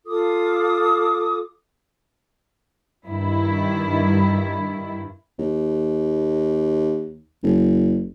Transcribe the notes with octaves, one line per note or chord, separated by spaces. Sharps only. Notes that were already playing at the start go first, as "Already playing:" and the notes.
F4 A4 D6 D#6
G2 D#3 E4
D#2
F#1